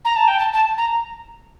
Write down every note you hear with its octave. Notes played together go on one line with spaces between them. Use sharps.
A#5
A5
G5
A5
A5
A#5